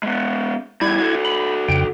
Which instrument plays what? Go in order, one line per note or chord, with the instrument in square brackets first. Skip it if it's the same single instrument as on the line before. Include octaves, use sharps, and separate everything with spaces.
[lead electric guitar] G#3 B3
[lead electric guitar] E2 G3 [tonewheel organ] E4 G#6
[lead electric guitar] F#4 A4
[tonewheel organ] B5
F2 C#3 G5